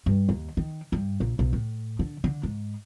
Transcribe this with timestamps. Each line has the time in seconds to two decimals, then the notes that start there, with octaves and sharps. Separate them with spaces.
0.06 G2
0.29 D#2
0.57 D#3
0.92 G2
1.20 A#1
1.39 B1
1.53 A2
1.99 D3
2.24 D3
2.43 G#2